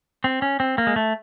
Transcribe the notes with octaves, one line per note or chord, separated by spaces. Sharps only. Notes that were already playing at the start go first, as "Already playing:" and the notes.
C4
C#4
C4
A#3
G#3
A3